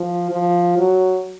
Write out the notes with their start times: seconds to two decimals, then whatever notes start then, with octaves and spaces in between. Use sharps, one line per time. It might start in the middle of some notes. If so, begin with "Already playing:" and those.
Already playing: F3
0.31 F3
0.78 F#3